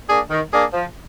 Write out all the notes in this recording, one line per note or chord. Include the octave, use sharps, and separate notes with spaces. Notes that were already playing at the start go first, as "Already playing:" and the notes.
A#3 D4 G#4
D#3
A#3 D4 G#4
F3